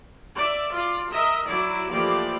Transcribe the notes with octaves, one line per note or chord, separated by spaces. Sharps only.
D5 E5
F4 D5
A#4 D#5 E5
F#3 E4 D5
E3 F3 A3 A#3 G4 D5